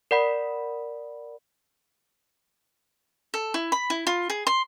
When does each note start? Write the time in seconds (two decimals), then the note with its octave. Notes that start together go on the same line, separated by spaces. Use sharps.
0.11 A#4 D5 F#5 B5
3.34 A4
3.54 E4
3.72 B5
3.90 E4
4.07 F4
4.30 G#4
4.47 C6